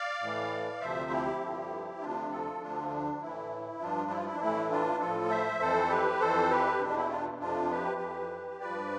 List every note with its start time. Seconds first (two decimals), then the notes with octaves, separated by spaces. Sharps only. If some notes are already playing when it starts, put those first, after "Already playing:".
Already playing: D5 F5
0.21 A2 E3
0.81 D2 C3 F3 C5 E5
1.11 E4 G4
1.41 G2 D3 F3
2.00 D2 C3 F3 D4 F4
2.30 F4 A4
2.61 D2 D3 F3 D4 F4
2.90 D4
3.20 A2 E3 E4
3.80 G2 F3 D4 F4
4.11 E4
4.17 F4
4.25 E4
4.33 D4
4.40 A2 E3 E4
4.70 D4 F4
5.00 A2 F3 F4 A4
5.30 C5 E5
5.60 F2 E3 A4 C5
5.90 G4 B4
6.20 F2 E3 A4 C5
6.50 G4 B4
6.80 E2 B2 D4
6.96 E4
7.10 D4 F4
7.40 F2 C3 F3 D4 F4
7.71 G4 B4
8.00 F2 E3
8.60 G2 F3 B4 D5